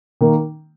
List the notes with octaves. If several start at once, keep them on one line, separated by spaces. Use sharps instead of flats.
D#3 A#3